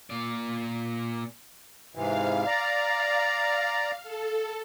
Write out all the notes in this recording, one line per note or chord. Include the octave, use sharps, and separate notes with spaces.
A#2 D5
G#2 C3 E3 F5
D5 A#5
A4